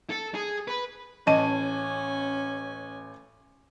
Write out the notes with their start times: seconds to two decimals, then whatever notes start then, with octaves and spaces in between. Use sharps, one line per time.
0.10 A4
0.35 G#4
0.68 B4
1.27 A1 C#4 D#5 G#5 A5 D#7